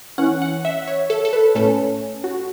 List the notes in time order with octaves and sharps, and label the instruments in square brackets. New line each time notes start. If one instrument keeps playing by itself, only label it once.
[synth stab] E3 C#4 F#5
F#5
E5
C#5
A4
A4
B4
A2 A3 C#4 A4
F#4